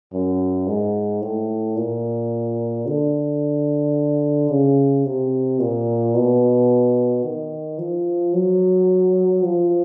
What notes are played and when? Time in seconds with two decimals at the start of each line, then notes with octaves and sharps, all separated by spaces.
0.13 F#2
0.67 G#2
1.22 A2
1.76 A#2
2.86 D3
4.50 C#3
5.05 C3
5.59 A#2
6.14 B2
7.24 D#3
7.79 F3
8.34 F#3
9.43 F3